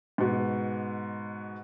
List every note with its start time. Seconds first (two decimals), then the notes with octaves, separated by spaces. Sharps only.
0.18 G#2 B2